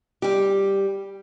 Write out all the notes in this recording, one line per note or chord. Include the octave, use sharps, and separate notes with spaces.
G3 G4